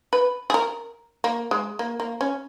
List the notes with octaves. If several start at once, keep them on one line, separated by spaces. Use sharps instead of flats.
B4
G#4
A#4
A#3
G#3
A#3
A#3
C#4